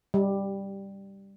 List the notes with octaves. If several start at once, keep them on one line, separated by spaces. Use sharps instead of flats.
G3